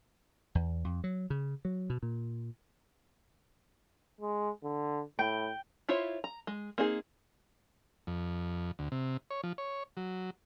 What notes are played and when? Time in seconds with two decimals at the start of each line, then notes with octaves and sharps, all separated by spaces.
0.55 E2
0.85 F2
1.04 F#3
1.30 C#3
1.65 F#3
1.90 B2
2.03 A#2
4.21 G#3
4.64 D3
5.19 A2 G5
5.89 E4 F4 C5 C#5 E5
6.24 A#5
6.47 G#3
6.78 A#3 C4 D#4 G#4
8.07 F2
8.79 D2
8.92 C3
9.31 C#5
9.43 F3
9.58 C#5
9.97 F#3